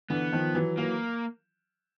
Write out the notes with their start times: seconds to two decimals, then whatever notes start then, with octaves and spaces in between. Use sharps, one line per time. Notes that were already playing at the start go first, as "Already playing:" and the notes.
0.10 D3 E3 B3
0.32 D#3 F3
0.55 E3 F#3
0.77 E3 F#3 A#3